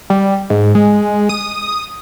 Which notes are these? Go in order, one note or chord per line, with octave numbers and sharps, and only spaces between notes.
G3
G#2
G#3
D#6